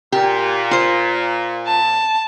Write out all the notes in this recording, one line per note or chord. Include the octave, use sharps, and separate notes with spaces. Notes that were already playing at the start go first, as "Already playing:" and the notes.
A#2 G4
F4 C5
A5